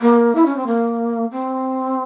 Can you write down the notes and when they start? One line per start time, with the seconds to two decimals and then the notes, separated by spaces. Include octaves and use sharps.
0.01 A#3
0.35 E4
0.46 C#4
0.56 C4
0.66 A#3
1.31 C4